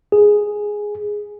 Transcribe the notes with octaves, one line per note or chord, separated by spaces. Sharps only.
G#4